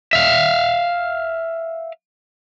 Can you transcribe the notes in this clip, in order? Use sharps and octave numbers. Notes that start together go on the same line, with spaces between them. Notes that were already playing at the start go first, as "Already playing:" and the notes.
E5 F5